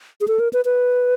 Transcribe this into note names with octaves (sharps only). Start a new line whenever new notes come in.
G#4
A4
A#4
B4
B4